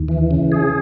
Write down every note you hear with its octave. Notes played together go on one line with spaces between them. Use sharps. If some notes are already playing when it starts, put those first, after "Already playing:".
Already playing: D#2
E3
C#3
G#4